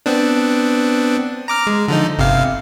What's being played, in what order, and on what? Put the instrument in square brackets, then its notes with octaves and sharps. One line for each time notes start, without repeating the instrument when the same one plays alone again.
[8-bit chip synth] B3 C4 D4
A#5 D6 F6
G#3
D3 F3 D#4
G1 C3 F5